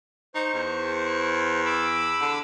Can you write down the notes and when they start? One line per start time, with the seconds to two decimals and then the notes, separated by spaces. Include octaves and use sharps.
0.35 D#4 C5 C#6
0.54 E2
1.65 B5 D6 E6
2.21 D3